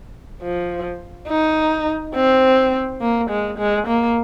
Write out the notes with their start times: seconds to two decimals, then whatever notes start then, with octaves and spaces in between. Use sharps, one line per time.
0.43 F3
1.29 D#4
2.15 C4
3.01 A#3
3.30 G#3
3.58 G#3
3.87 A#3